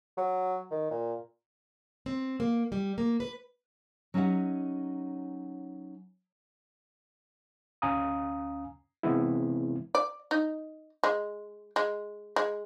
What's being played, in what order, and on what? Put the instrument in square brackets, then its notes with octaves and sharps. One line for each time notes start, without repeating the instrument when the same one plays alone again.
[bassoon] F#3
D#3
A#2
[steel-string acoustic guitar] C4
A#3
G3
A#3
B4
[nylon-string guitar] F#3 C#4 D#4 G4 E5 F#5
[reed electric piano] D2 C#4 F5 G#5 A#5 D#6
C3 E3 G#3 B3 C4 E4
[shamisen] D5
D#4
G#3
G#3
G#3